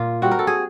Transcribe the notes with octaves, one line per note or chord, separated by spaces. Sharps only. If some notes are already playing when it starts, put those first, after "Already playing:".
Already playing: A#2 F4
G3 C4 F#4
A#4
A4
G#4